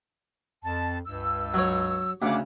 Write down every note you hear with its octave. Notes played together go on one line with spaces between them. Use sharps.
F2 A5
C#2 G2 E6
F#3 C#5
D2 C#3 F#5 D6